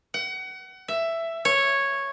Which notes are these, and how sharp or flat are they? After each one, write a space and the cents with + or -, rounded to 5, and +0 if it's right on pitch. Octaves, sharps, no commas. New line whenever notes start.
F#5 +30
E5 +10
C#5 -5